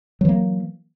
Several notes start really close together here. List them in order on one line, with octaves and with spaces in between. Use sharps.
F#3 E3 A#3